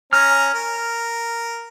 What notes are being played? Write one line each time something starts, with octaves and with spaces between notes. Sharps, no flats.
C#4 G#5 A#5 F6
A#4